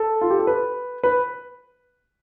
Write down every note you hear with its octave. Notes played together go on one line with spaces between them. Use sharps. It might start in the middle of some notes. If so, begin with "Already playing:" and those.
Already playing: A4
F4
G4
A4
B4
B4